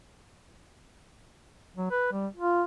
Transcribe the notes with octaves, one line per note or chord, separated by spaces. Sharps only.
F#3
B4
G3
F4